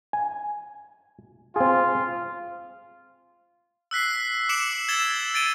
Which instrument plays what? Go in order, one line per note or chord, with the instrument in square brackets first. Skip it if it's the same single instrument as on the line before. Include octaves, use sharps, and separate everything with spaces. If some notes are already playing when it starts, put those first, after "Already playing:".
[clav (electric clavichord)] G#5
[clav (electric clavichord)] C4 G#4 [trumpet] F4
[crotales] E6 F#6 B6 C7
D6 C#7 D7 E7 F#7
E6 G#6 A6 E7 G7
A6 D7 D#7 G7